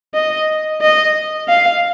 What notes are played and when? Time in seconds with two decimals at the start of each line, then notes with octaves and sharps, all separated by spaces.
0.15 D#5
0.82 D#5
1.49 F5